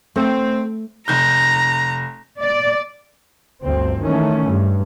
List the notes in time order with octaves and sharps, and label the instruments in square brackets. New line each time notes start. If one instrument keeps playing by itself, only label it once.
[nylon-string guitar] A3 [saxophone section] C4
[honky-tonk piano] F1 G6 [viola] A#5
[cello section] D5
[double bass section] G1 D2 C4
D#3 E3 A3 C#4
G2